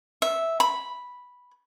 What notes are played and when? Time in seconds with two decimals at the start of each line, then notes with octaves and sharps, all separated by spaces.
0.22 E5
0.60 B5